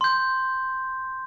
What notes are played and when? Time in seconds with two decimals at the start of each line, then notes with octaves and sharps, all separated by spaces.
0.01 C6 G6